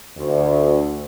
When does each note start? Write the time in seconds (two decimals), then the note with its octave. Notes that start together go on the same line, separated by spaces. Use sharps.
0.17 D2